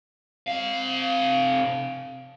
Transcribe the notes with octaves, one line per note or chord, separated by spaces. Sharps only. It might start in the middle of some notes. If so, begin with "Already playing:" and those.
C3 F5